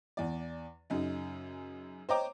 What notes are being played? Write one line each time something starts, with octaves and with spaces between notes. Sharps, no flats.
E2 D5
F#2 C#3 D#4
C5 C#5 D#5 G5 A#5 D6